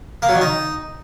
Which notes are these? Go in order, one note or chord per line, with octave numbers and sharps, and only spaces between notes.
A#3
F#3
D#3
D#4